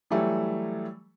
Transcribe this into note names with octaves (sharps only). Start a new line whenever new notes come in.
E3 F#3 G3 A3